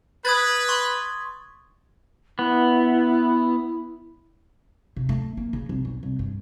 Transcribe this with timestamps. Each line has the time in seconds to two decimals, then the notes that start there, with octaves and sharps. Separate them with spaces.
0.25 B4 D#6 G#6 A6
0.69 C6 C#6
2.39 B3 E4
4.96 C3
5.09 A3
5.37 A#3
5.53 C#3
5.69 C2
5.85 B1
6.03 C2
6.19 G2